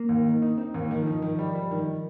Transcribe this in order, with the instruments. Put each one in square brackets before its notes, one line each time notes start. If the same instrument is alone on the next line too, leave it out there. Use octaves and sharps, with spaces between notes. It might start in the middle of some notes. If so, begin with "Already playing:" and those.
Already playing: [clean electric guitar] A#3
[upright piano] D#2
D#3
D#4
[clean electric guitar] C4 [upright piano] D#4
[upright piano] D#2 [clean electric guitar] A#3
[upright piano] D#3
[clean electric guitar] F3 [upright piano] D#4
[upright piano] D#3
G3
G3
D#3